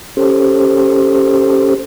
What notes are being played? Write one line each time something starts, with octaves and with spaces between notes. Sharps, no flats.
C#4 G4 A4 C5